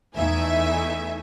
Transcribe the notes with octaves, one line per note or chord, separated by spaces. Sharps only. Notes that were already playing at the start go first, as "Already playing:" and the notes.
E2 A3 D#4 E4 E5 G#5